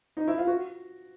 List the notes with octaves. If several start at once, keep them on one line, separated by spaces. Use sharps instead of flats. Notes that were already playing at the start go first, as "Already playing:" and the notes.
D#4
E4
F4
F#4